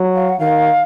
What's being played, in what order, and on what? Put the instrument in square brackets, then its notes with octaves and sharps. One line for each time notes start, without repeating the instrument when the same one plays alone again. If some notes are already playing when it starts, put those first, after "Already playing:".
Already playing: [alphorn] F#3
[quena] F5
F#5
[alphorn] D#3 [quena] F5